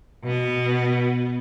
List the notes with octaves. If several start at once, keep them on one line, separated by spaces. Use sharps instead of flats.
B2 B3